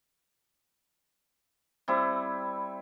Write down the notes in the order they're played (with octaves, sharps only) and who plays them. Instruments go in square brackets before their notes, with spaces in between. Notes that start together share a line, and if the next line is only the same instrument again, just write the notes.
[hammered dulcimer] G3 C4 E4